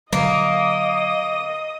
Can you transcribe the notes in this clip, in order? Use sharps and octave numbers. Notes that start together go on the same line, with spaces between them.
D3 F#3 A#3 D#5 D#6